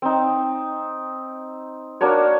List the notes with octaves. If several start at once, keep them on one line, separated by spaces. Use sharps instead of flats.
C4 D#4
A#3 D4 F#4 C#5